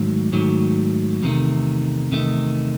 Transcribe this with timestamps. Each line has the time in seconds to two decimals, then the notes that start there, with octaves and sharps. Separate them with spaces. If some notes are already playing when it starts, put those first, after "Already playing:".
Already playing: G#2 D#3 F#3 A3
0.32 G#2 D#3 F#3 A3
1.23 E2 C3 D#3 A3
2.11 E2 C3 D#3 A3